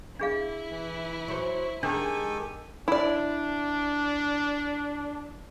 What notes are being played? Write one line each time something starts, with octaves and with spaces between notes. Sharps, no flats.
D4 E4 G#4 F5
E3
F#3 C5
D#3 G#3 D4 G4 A4 G5 G#5
D4 E4 D5